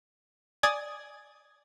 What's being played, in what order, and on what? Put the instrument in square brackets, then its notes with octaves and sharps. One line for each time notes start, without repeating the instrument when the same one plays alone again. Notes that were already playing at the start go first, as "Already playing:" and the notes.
[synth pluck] D5 G#5 D#6 G#6 A6